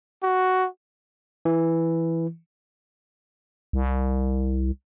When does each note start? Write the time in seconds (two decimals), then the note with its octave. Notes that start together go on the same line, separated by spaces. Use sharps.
0.23 F#4
1.45 E3
3.73 C2